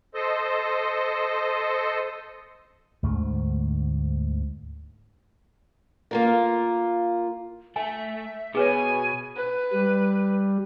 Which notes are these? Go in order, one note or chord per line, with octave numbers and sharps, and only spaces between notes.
A4 C5 D#5
D2 G#2 D3 A3
A#3 F4 A#4
A3 E5 G#5
B2 G#4 B4 C#5 G#5
B4
G3